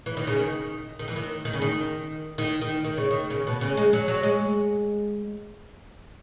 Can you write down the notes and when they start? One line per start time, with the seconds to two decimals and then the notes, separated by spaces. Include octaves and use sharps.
0.06 E3
0.17 D#3
0.27 C#3
0.38 D#3
0.99 D#3
1.08 E3
1.16 D#3
1.45 D#3
1.53 C#3
1.62 D#3
2.38 D#3
2.62 D#3
2.84 D#3
2.97 C#3
3.11 D#3
3.30 C#3
3.47 B2
3.61 C#3
3.77 G#3
3.93 F#3
4.08 F#3
4.23 G#3